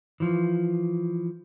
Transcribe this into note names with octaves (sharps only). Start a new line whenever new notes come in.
E3 F3